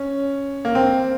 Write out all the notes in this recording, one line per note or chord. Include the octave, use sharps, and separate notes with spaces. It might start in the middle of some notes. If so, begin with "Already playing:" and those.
Already playing: C#4
A#3
C4